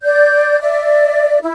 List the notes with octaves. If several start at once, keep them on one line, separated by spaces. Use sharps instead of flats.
D5 G6
D5 E5
E4